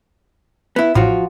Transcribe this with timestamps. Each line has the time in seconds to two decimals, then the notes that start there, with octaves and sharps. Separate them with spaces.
0.76 B3 E4
0.95 A1 F3 F4 F#4